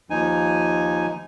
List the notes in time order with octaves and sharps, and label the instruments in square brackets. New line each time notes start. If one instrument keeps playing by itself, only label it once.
[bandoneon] D#2 F3 D#4 G#5